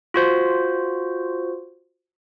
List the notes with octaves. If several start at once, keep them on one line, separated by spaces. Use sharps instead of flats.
F4 F#4 C5